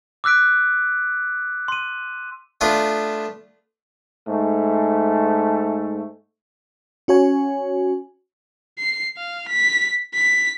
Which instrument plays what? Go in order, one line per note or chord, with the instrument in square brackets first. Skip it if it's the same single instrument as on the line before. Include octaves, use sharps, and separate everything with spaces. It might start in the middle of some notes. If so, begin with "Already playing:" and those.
[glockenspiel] D6 E6 F#6 B6 D7
C6 D#7
[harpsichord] A3 B3 D4 F4
[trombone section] G#2 A3
[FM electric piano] C#4 F#4 C#5 G#5
[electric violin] C7
F5
B6
B6